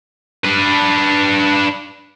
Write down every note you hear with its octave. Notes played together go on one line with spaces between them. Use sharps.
D4 B4